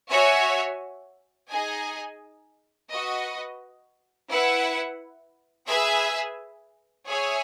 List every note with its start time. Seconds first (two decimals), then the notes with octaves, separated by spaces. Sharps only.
0.10 F#4 C#5 E5 G#5
1.50 D#4 G#4 D#5 G#5
2.90 F#4 B4 D#5
4.28 E4 B4 F#5
5.68 G#4 B4 E5 G#5
7.07 G#4 C#5 E5 G#5